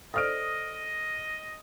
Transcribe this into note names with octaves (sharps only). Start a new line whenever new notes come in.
A4 C5 D5 D#5 D#6 F6 D7